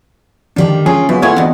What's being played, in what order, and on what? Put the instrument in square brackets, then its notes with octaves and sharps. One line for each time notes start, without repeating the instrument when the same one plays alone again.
[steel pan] D3 D4 [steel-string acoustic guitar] D#3 G3 A#3
[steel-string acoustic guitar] C#4 F4 A#4 [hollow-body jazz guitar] G#4
[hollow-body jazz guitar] F#2 [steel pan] B3 F4 G#4 [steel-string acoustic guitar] E4
[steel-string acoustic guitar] G3 F#5 G#5 [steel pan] A3 F4 [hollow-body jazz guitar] E4 C#5
[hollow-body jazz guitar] E2 B2 [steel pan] C4 D#4